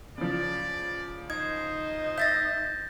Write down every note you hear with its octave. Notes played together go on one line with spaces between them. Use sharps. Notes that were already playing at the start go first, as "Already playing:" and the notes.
C#3 F3 D5
D#4 C5 G#6
E5 G6 A6 A#6